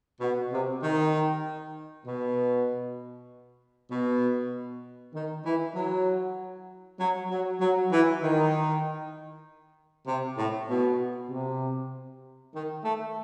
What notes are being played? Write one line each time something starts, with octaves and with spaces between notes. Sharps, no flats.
B2
C3
D#3
B2
B2
D#3
E3
F#3
F#3
F#3
F#3
E3
D#3
C3
A2
B2
C3
D#3
A3